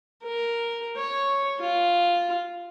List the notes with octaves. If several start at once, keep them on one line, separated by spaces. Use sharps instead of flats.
A#4
C#5
F4